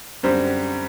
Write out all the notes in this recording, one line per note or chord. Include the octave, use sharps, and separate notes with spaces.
F#2 D3 G3 C4 C5